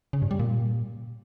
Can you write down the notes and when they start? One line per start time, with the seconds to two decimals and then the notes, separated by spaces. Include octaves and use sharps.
0.13 C#3
0.22 G2
0.31 G3
0.39 A#2